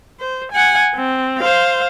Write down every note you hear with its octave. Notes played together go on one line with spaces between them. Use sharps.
C5
F#5 G#5
C4
C5 F5